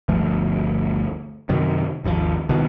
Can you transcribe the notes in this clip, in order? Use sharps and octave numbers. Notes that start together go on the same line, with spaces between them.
G1 D2 F3 A3
F#2 C3 D#3
G#1 D#2 D#3 F3
C2 B2 D#3